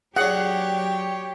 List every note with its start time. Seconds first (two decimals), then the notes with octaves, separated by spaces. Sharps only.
0.16 F#3 D4 G4 G#4 C#5 F#5